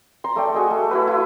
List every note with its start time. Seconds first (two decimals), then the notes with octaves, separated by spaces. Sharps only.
0.24 A#5 C6
0.36 A3 D5 G5
0.54 F#4 G#4 D#5
0.70 A3
0.91 E4 F#4 B4
1.07 E4